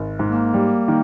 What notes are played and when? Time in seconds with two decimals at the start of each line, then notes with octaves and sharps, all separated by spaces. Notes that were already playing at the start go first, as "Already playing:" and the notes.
Already playing: G#1
0.19 G#2
0.30 A#3
0.54 G3
0.88 D#3